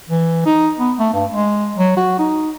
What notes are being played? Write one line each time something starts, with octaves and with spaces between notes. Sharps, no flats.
E3
D#4
B3
A3
G2
G#3
F#3
F#4
D#4